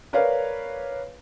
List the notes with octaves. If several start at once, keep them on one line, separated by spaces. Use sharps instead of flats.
A#4 B4 C#5 D5 F5